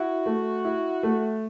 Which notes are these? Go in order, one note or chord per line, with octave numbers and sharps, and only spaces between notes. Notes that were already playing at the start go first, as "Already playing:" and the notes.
Already playing: E4 F#4
A3
E4
A3